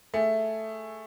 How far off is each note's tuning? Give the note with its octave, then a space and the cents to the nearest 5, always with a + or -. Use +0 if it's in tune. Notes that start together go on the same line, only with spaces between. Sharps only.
A3 +0 G#4 +0